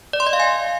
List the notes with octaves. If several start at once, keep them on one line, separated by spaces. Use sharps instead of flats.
D5
C6
D#5
F5
G#5